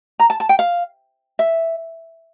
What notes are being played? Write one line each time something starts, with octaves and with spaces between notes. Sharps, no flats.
A#5
A5
A5
G5
F5
E5